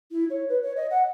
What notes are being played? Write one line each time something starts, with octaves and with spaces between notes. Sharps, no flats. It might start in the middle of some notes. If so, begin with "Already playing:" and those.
E4
C#5
B4
C#5
D#5
F#5